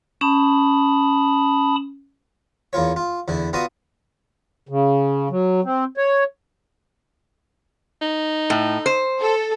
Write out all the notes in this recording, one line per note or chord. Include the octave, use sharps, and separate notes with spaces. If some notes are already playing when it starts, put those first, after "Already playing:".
C#4 A5 B5 D#6
E2 A#3 F4 C#5
F4
E2 D3 E4
B3 F4 F#4 D5 A#5 D#6
C#3
F#3
C4
C#5
D#4
A2
C5
A4